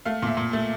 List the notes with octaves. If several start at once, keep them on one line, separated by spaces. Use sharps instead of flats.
A3 F5
A#2 E5
A#2
A3